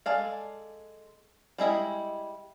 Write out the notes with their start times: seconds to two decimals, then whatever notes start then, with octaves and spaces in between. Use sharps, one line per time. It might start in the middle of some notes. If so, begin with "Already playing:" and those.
0.06 G#3 A4 D5 F5
1.58 G3 G#3 E4 D#5